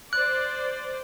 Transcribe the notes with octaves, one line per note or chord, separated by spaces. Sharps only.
C5 D5 F#6